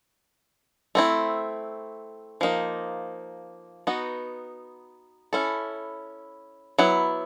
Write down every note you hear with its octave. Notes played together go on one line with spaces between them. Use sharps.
A3 C4 E4
F3 A#3 D#4
B3 D#4 F#4
C#4 E4 A4
F#3 B3 E4